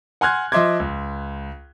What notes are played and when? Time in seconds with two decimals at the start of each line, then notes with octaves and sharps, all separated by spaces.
0.21 F#5 G#5 C6 F6 F#6 G#6
0.52 F3 D#5 E5 C6 D6 G#6
0.80 C#2